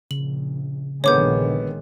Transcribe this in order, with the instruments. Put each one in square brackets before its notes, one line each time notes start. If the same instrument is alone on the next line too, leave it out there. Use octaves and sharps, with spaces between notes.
[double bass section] A#1 [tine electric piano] C#3 [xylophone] F#7
[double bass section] A#1 D#3 G#3 [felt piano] D3 B3 [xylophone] C#5 D6 G6